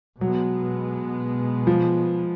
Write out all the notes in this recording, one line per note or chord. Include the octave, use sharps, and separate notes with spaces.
B2 F#3 G#3 B3
F3